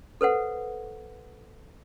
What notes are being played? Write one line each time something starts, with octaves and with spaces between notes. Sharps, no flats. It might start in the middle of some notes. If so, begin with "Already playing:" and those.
A4 B4 C5 F#5